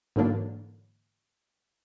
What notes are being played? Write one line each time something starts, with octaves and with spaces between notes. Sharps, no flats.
G#2 D3 E3 F#3 A#3 D4